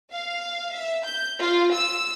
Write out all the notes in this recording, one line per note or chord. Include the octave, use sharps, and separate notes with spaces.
F5
E5
G6
F4
E6